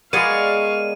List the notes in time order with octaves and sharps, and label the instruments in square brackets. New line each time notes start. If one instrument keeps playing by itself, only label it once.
[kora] G#3 B3 [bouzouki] G#4 A#4 D5 [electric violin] F5 C#6 [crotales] D#7